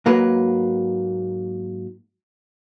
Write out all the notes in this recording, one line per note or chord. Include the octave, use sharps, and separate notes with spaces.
G#2 F#3 A#3 B4